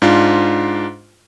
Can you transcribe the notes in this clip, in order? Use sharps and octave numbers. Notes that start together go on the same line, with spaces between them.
G#2 D4 F4